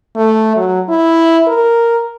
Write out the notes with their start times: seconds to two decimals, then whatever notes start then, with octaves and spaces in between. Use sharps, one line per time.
0.16 A3
0.56 F#3
0.89 E4
1.47 A#4